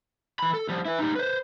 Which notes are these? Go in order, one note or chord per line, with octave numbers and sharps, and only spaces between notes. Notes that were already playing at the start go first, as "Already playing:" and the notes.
E3 B5
A4
F3 G3
E4 B4
G3 D#4
B4 C5